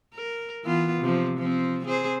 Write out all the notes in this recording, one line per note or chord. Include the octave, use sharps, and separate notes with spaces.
A#4
E3 B3 F4
C3 F3
F3 C4
C4 G#4 C5